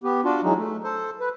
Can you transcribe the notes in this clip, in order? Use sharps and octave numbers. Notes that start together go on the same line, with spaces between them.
B3 G4
D4 F4 F#4
E3 F#3 G#3 D#4
A3
A4 C5
B4